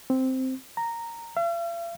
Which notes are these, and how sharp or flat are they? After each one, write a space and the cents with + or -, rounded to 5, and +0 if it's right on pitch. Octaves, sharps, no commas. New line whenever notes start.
C4 -5
A#5 -10
F5 -45